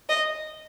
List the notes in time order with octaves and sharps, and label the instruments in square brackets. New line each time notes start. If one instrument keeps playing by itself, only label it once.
[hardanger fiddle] D#5